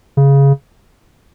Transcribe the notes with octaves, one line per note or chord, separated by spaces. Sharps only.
C#3